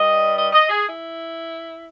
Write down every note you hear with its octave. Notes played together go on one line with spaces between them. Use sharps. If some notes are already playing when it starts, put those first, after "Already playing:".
Already playing: G2 G3 D#5
D#5
D#5
G#4
E4